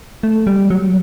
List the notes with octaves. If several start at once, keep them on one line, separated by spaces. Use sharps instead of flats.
A3
G3
F#3